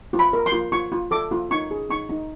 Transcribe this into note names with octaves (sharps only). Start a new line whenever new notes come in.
F4
B5
A#4
C6
F4
F4 C#6
F4
A4 D6
F4
D#4 C#6
G#4
D#4 C#6
D#4